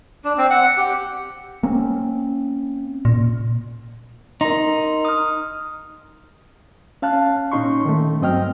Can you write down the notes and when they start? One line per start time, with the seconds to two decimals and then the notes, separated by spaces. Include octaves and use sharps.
0.25 D4
0.38 C4
0.50 F#5
0.77 G4
1.63 A#3 C4 C#4
3.05 A#2
4.41 D#4 A#4 C6
5.05 D#6 F6
7.02 C#4 F5 A5 F#6
7.52 A#2 C#4 D#4 C6 C#6
7.85 D#3 A3
8.21 G2 F#3 C4 D#5 G5 F6